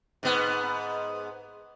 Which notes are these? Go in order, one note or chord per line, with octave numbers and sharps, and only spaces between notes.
G#2 B3